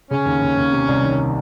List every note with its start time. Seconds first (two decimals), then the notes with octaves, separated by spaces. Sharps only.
0.10 C#3 C#4
0.26 D#2
0.41 D#2
0.57 D#2
0.72 C3
0.88 C2
1.03 D#3